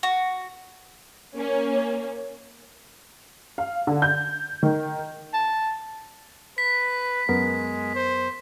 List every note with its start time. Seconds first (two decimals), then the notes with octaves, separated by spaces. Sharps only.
0.03 F#4
1.36 A#3 C#4
3.58 F5
3.87 D3
4.02 G6
4.63 D#3
5.33 A5
6.58 B4 B6
7.29 F#2 G#3 B3 A#4
7.95 C5